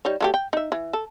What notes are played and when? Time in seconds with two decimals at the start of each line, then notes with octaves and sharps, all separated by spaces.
0.05 G3 D#4 C#5
0.21 F#3 A3 G4
0.34 G5
0.53 D#4 E5
0.72 E3
0.93 A4